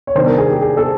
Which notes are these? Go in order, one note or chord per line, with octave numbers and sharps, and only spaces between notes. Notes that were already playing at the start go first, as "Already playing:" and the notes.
C#5
C3 D#3 G3 B3 D4 C5
A#4
G#4
G4
G#4
A4